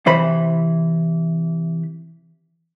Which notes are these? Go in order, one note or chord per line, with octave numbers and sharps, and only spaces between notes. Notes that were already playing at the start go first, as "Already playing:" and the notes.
C3 E3 C5 B5